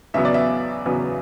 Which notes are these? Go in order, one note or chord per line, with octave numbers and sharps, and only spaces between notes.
E2 C#3 F#3 B3 E5
D5
E5
E2 C#3 F#3 B3